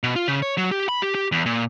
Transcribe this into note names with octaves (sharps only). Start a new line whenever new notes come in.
B2
F4
C#3
C#5
F#3
G4
B5
G4
G4
E2
A#2